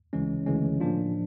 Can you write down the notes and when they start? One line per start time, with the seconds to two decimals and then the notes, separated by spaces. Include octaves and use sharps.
0.13 D2 C#3 E3 G#3 C#4
0.46 D2 C#3 E3 G#3 C#4
0.80 A2 F3 A#3 D4 F4